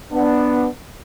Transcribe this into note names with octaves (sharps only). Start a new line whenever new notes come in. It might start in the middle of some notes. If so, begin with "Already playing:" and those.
B3 D4